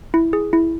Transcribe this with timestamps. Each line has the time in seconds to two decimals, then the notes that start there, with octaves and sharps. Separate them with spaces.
0.14 E4
0.33 G#4
0.53 E4